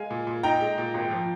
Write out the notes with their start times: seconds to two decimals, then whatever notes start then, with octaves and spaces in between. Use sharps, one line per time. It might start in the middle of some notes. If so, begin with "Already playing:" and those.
Already playing: G#3 F5 G#5
0.11 A#2
0.27 A#2
0.43 D#4 G5 A#5
0.61 G#3
0.78 A#2
0.94 G#1
1.11 F3